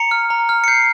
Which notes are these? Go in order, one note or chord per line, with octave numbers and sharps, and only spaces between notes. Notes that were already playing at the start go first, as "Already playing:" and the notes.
Already playing: A#5 C#7
F6
A#5
F6
C#7
G6 C7